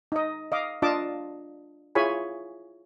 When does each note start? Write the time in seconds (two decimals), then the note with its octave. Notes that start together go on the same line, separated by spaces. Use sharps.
0.12 D#4 D#5
0.52 D#5 F5 D6
0.82 D4 F4 D#5 F5 A5 D6
1.95 E4 F4 G#4 C#5 G#5 B5